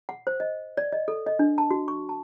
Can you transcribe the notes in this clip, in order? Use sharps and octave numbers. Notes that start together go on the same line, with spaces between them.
F#5
C5
D#5
D5
D#5
A4
D#5
D4
A5
F#4
C#6
A5